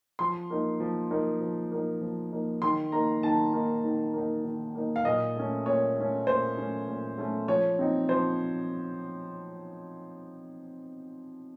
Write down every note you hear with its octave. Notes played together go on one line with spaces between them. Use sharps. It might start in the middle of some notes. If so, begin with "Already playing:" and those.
F3 C6
A#3 D#4
F3
A#3 D#4
F3
A#3 D#4
F3
A#3 D#4
D#3 C6
A#3 D#4 A#5
D#3 A5
A#3 D#4
D#3
A#3 D#4
D#3
A#3 D#4
F5
A#2 D#5
A3 C#4
A#2 C#5
A3 C#4
A#2 C5
A3 C#4
A#2
A3 C#4
F3 C#5
C4 D#4
F3 C5